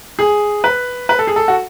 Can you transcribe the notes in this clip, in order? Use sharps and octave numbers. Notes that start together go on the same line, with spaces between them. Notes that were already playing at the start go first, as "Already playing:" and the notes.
G#4
B4
B4
A4
G#4
A4
F#4